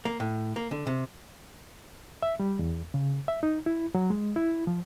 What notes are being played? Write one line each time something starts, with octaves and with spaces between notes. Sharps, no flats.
A#3
A2
A#3
D3
C3
E5
G3
E2
C#3
E5
D#4
E4
F#3
G#3
E4
F3